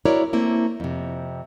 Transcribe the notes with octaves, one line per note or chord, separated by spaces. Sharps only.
E4 F#4 A#4 C#5 D5
A3 A#3 C4 E4
F2 C3